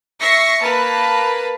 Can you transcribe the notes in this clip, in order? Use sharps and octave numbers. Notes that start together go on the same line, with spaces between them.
E5 C#6 A#6 C7 C#7
A#3 B4 A5